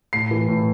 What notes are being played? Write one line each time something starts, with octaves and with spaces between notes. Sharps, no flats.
A2 C7
E3
A2